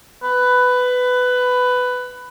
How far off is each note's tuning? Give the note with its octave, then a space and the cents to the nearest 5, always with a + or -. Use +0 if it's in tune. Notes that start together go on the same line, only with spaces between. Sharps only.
B4 +15